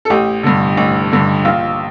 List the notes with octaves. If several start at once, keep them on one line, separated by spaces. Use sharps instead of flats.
A4
A1 G4
G2 D3
A1
G2 D3
A#1 F4